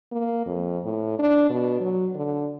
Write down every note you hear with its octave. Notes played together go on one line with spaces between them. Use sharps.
A#3
F2
A2
D4
B2
F#3
D3